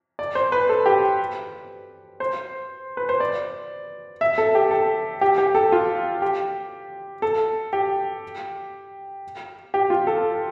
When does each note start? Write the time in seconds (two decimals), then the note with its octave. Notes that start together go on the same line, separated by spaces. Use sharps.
0.19 D5
0.35 C5
0.52 B4
0.69 A4
0.86 G4
2.20 C5
2.97 B4
3.09 C5
3.20 D5
4.21 E5
4.38 A4
4.55 G4
4.71 A4
5.21 G4
5.38 G4
5.55 A4
5.72 F4
6.22 G4
7.22 A4
7.73 G4
9.74 G4
9.90 F4
10.07 A4